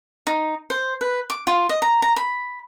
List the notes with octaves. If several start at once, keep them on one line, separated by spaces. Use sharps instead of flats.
D#4
C5
B4
D6
F4
D#5
A#5
A#5
B5